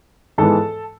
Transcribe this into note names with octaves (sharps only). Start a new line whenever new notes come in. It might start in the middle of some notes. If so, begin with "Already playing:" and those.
G#2 E3 G#3 B3 A4 A5